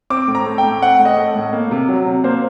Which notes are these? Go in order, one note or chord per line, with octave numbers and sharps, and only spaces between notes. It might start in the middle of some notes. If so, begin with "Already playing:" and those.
C4 D6
A2
A#5
A3
G5
A2
C4 F#5
A2
D#5
A3
A2
A#3
C3
F#3
C3
A#3 C5